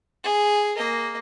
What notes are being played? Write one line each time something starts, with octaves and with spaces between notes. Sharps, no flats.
G#4
A#3 D#5